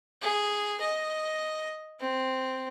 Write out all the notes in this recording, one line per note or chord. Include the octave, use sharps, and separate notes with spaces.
G#4
D#5
C4